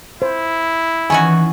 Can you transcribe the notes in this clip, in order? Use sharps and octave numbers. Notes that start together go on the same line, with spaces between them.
E4 C5
D#3 E3 C#4 F#4 G#5